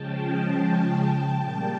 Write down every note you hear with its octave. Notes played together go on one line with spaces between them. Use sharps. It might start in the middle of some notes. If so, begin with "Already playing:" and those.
Already playing: C#3 F3 G#3 C#4 G5 A5
A#2 G3 A#3